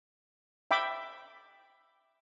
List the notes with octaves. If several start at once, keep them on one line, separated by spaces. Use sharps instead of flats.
E5 G5 B5 D6